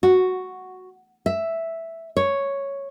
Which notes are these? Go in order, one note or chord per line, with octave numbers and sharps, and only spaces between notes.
F#4
E5
C#5